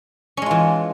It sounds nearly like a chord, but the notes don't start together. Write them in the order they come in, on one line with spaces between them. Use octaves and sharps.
C#4 G#3 F4 E3